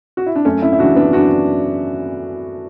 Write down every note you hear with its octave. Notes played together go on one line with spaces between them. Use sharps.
F#4
E4
D4
F#2 A3 C#4
C#4 E4
E4
C#3 E3 D4 F#4
B3 D4
F#2 D4 F#4